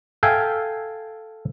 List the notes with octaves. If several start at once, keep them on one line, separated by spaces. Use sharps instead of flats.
A4 E5 F5 G5 G#5